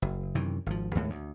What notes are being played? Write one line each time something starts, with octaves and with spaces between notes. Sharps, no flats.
F#1
F#2 C3 D#3 E3
G#1 F3
D#2 A2 G#3
D2